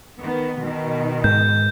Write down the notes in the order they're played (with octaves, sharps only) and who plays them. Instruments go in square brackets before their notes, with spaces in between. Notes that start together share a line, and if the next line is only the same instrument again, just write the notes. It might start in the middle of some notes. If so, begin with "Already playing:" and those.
[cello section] D#3 B3
B2 D#3
[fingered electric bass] G#2 [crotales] G6